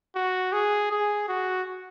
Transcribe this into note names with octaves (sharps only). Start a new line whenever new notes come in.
F#4
G#4
G#4
F#4